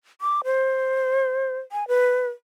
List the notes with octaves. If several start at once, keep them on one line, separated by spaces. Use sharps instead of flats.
D6
C5
G#5
B4